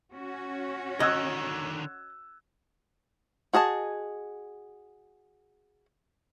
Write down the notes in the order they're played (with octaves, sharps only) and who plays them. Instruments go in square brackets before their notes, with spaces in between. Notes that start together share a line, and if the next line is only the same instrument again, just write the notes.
[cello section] C#4 F#4
[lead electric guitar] D3 D#3 [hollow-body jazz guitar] D#5 [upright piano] E6 F#6 G#6
[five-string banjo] F#4 G#4 D#5 A5